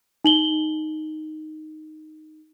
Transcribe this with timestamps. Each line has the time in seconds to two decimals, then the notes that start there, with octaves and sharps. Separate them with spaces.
0.24 D#4 F#7 G7